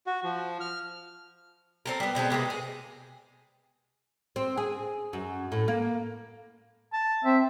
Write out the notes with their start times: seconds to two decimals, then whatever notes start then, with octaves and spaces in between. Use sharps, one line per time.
0.07 F#4
0.24 F3
0.60 F6
1.86 C4 A4 A#4
2.00 G3 B3
2.15 B2 G#3 C4 A4
2.30 C3 G#3 A#3 B3
2.50 G#4
4.36 C4
4.58 G#4
5.13 F#2
5.52 A2
5.68 A#3
6.93 A5
7.25 C4 E5